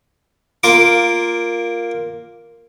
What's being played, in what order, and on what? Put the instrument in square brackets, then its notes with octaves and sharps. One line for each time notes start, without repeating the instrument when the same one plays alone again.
[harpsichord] A#3 F4 A#4 D6